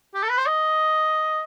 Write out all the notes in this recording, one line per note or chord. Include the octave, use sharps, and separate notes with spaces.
G4
A4
B4
C5
D#5